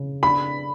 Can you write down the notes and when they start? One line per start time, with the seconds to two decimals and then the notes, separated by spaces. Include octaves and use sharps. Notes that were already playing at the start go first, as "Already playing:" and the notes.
Already playing: C#3
0.23 D4 B5